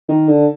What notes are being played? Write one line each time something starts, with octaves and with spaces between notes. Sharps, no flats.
D#3
D3